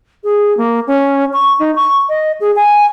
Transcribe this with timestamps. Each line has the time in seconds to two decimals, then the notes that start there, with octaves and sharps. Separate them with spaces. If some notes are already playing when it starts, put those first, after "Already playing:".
0.24 G#4
0.57 A#3
0.87 C#4
1.33 C#6
1.59 D#4
1.76 C#6
2.09 D#5
2.40 G#4
2.56 G#5